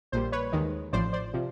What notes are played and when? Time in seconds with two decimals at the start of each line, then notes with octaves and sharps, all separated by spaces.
0.12 A#1 A#2 G3 C5
0.32 B4 C#5
0.52 D#2 D#3 G#3
0.93 A1 A2 F3 C5 D5
1.13 C5 D5
1.33 C3 F3